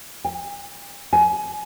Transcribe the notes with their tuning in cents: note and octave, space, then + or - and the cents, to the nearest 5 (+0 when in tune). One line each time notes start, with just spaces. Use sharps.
G#5 -45
G#5 +25